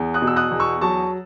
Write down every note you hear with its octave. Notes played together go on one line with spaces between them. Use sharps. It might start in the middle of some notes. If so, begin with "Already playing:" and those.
Already playing: E2
D#6 F#6
B2
E6
D#6 F#6
E2
C#6 E6
F#3 A5 C#6